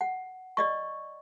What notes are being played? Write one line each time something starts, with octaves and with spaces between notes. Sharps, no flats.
F#5
D5 D#5 C#6